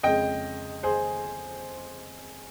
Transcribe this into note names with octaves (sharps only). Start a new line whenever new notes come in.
F2 C#3 G#3 D#5 G5
G#4 C5